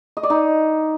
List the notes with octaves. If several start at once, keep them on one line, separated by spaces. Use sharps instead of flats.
D#5
D5
D#4